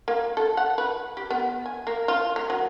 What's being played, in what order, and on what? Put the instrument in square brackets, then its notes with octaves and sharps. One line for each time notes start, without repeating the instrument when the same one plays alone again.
[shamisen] A#3
A4
F#5
B4
G4
B3
G#5
A#3
F4
A#3
F#3